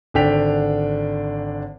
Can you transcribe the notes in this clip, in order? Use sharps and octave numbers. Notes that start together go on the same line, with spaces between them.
G#1 D3 D4 G5 B6 F7